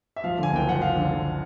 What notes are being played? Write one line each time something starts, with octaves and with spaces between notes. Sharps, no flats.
E5
F3 F5
D3 G#5
F#1 G5
F3 F#5
F3 F5
D3
D3